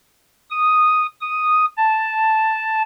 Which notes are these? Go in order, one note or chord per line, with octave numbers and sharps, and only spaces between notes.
D#6
D#6
A5